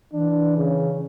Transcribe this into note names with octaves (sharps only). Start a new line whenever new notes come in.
E3 D4
C#3